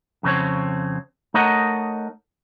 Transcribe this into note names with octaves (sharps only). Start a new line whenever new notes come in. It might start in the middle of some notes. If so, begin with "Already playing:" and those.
F2 C#3 C4 C#5
A3 D#4 A#4 C#5 D#5 F#5